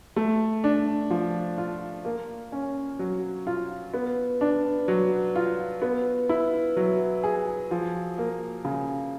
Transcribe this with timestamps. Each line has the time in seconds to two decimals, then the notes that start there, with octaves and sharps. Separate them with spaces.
0.16 A3
0.64 D4
1.10 F3
1.58 F4
2.05 A#3
2.52 C#4
2.99 F#3
3.47 F4
3.94 B3
4.41 D4
4.88 F#3
5.36 F4
5.82 B3
6.29 E4
6.77 F#3
7.24 G#4
7.71 F3
8.18 A#3
8.65 C#3